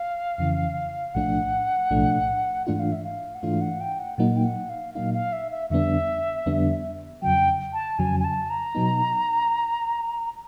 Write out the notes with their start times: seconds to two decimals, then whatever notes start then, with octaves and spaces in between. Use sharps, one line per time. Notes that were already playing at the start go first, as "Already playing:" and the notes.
Already playing: F5
0.38 F2 C#3 E3
1.14 B1 A2 F3 A3 D4 F#5
1.91 B1 A2 F3 A3 D4
2.67 G#2 E3 A3 D4 F4 F#5
2.79 F5
2.92 E5
3.04 F5
3.35 F#5
3.43 G#2 E3 A3 D4 F4 F5
3.61 F#5
3.81 G5
3.99 F#5
4.18 A#2 F#3 A#3 D#4 F#5
4.37 G5
4.44 F#5
4.69 F5
4.94 A#2 F#3 A#3 D#4 F5
5.14 F5
5.33 E5
5.51 E5
5.70 F2 D3 G3 B3 D4 E5
6.46 F2 D3 G3 B3 D4
7.22 F2 C#3 F#3 G5
7.73 A5
7.99 F2 C#3 F#3 G#5
8.20 G#5
8.24 A5
8.50 A#5
8.75 B2 F#3 B3 D#4